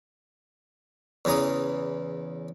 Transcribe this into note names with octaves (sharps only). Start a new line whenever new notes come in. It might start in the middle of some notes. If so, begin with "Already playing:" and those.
E2 C#3 E3 A#5 D#6